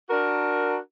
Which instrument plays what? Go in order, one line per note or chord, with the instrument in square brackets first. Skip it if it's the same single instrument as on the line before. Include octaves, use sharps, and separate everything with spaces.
[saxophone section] D4 F#4 A#4